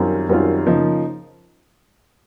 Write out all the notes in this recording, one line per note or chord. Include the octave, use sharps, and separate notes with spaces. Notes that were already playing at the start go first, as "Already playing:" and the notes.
Already playing: F#2 D#3 G3 C4 F4
F#2 D#3 G3 C4 F4
C#3 F3 A#3 D#4